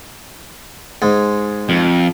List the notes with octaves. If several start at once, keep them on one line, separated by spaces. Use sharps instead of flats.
G#2 G#3
F2